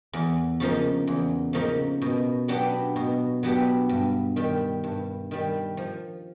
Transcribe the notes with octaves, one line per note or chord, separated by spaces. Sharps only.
E2
C#3 F3 A#3 D#4
E2
C#3 F3 A#3 D#4
B2
F#3 B3 D4 G4
B2
F#3 B3 D4 G4
G2
D#3 G3
G2
D#3 G3
F3